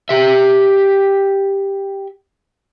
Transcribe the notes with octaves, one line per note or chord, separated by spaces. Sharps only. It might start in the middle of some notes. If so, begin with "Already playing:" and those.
G4 E5